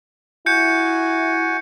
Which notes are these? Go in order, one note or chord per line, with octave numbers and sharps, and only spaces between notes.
E4 F#4 G#5 G6 C#7